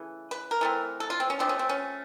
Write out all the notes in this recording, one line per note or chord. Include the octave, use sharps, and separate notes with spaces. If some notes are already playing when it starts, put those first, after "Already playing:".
Already playing: C#3 E3 A3
B4
A#4
E3 A3 C4
A4
F4
C4
C#4
F3 A3 C4 D4
C#4
C4
C#4